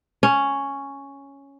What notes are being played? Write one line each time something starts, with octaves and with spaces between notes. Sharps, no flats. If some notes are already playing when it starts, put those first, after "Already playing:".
C#4